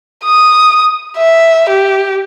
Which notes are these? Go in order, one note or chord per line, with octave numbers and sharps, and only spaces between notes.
D#6
E5
G4